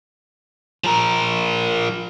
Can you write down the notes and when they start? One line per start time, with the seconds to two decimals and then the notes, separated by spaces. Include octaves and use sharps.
0.84 F3 A#4